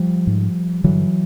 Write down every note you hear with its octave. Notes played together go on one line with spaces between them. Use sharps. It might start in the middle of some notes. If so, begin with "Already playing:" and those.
Already playing: F3 G3
G#2
G2 D3 E3 F#3